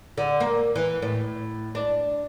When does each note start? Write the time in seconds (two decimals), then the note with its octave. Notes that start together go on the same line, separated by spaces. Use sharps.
0.18 D3
0.40 A#3
0.76 E3
1.02 A2
1.75 D4